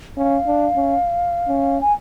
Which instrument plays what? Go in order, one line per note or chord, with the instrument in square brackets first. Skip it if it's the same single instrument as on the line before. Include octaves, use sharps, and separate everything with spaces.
[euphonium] C#4 [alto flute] F5
[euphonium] D4
C#4
C#4
[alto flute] G#5